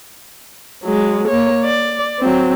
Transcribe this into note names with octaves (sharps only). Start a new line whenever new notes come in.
F#3 G#3
A#3 C#5
D5
F#3 C4